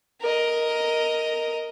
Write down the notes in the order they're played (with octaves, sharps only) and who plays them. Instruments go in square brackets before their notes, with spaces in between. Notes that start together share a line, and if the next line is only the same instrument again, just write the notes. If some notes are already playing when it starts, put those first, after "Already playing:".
[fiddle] A#4 D#5